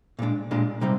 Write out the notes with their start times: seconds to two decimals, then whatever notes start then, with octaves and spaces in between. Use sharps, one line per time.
0.19 A#2 G#3 D4
0.51 A#2 G#3 D4
0.81 C3 G3 C4 D#4